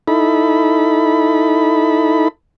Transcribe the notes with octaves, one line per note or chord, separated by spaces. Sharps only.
D#4 E4 A4 B5